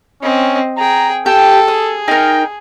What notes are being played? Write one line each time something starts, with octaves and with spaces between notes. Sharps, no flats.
C4 C#4 D#5
G#4 G5 A#5
G4 A4 G5 A5
G#4 D#6
D#4 A#4 G5